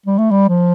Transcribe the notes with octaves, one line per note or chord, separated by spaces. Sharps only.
G3
A3
G3
F3